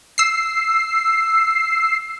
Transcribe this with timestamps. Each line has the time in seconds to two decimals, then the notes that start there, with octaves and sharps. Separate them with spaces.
0.18 E6 C7